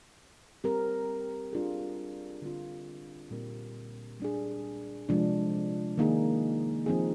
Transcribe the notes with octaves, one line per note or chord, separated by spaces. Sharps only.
G3 C4 G4 A#4
G3 D4 F4 G#4
D3 G3 C4 F4
A#2 G3 C4 G4 A#4
G3 D4 G#4
C3 F3 G#3 D4
D#3 A#3 D#4 G#4
F3 C4 D#4 G#4